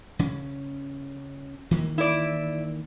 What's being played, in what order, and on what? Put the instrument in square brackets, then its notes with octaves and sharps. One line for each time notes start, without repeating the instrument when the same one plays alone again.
[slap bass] C#3 C#4
D#3 E3 A#3
[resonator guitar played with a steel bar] E4 D5